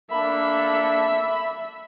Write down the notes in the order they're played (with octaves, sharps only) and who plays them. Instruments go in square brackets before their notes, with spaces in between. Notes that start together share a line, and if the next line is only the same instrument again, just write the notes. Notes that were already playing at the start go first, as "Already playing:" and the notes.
[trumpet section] A#3 D4 A4 [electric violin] E5 [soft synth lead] B5